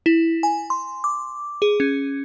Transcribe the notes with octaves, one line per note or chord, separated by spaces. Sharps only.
E4
G#5
C6
D6
G#4
C#4